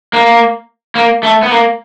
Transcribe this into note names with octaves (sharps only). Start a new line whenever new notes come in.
A#3
A#3
A3
B3
A#3